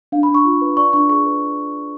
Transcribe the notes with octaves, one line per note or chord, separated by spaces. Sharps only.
D4 F5
B5
D4
C#6
F4
B4
D5 C#6
D4 C#6
G#4 C#6
B4